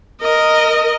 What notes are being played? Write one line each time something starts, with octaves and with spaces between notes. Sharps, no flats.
A#4 D#5